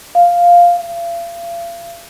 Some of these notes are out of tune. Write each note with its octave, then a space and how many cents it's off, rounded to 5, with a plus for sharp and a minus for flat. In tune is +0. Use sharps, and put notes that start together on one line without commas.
F5 +0
F5 -40